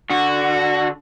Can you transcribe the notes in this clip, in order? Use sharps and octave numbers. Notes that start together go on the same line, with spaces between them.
D3 F#4